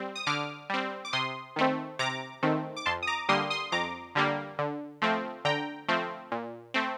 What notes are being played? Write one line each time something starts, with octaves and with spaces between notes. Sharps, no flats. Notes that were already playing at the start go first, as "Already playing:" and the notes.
Already playing: G3 C4
D#6
D3 D6 F6
G3 C4
D6
C3 C6 D#6
D#3 A3 C4
C3 A#5 D6
D#3 A3 C4
D6
F2 A5 C6
D#6
A#5 D6
D3 G3 A#3 C6 D#6
C6 D#6
F2 A#5 D6
D3 G3 A#3
D3
F3 A3 C4
D3 G5 A#5
F3 A3 C4
A#2
A3 C4